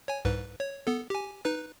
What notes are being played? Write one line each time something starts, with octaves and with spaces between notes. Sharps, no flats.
C#5 G#5
C2 G#2 B4
C#5
B3 A4
G4 G#5
D#4 B4 F#6